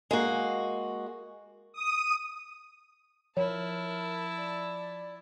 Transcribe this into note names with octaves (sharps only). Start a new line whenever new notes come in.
G#3 A#3 F#4
D#6
F3 E4 A#4 C#5 A5
D5